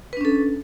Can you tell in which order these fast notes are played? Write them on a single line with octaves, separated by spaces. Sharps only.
B4 D4 C#4 A4